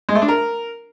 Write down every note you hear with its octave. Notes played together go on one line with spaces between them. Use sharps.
G#3
A3
D4
A#4